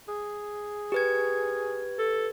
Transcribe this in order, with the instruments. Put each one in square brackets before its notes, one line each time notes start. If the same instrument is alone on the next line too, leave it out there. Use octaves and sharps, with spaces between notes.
[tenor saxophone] G#4
[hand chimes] G4 B4 G#6
[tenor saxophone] A4